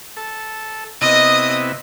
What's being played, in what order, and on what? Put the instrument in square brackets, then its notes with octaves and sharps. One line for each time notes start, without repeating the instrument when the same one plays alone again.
[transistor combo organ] A4
[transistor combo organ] C3 B3 E4 [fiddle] D#5 D#6